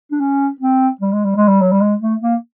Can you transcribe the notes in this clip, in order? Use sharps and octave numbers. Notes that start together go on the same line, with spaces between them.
D4
C#4
C4
G3
G#3
G3
G#3
G3
F#3
G3
G#3
A3
A#3